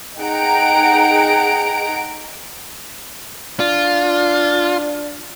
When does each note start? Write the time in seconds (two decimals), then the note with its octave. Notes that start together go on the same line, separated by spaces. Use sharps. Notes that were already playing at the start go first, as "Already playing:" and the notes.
0.20 D#4 G#4 F#5 G5 A#5 D7
3.60 D4 F4